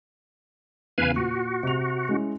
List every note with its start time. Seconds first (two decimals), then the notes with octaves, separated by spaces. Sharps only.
0.98 E2 C#3 B4 F5 G#5
1.16 A#2 F#4
1.63 C3 F7
2.09 G#3 C#4 E4